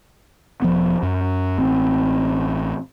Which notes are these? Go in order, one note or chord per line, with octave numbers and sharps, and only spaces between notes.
E1 F3 B3
F#2
A1 C4